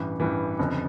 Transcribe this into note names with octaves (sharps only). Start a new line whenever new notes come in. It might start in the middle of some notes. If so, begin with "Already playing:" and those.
Already playing: A1 G2 E3
A1 G2 E3
G1 F2 C#3